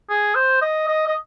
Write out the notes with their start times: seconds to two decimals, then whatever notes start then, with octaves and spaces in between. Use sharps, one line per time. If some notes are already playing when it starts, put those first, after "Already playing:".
0.10 G#4
0.35 C5
0.62 D#5
0.88 D#5
1.07 D#5